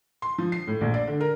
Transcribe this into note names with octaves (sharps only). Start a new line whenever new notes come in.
C6
F3
C7
A2
A#1
D5
D3
A#4